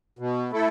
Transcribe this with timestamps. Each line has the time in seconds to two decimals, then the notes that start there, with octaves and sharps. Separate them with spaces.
0.19 B2
0.51 A3 E4 A4